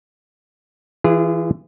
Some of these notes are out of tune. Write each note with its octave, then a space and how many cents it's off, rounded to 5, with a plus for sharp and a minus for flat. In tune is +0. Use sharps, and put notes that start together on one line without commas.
E3 +0 F4 -40 G#4 -15